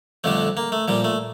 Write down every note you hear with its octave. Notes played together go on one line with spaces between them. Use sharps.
F2 D3 G3 A3
A#3
A3
A#2 F3 G3
A3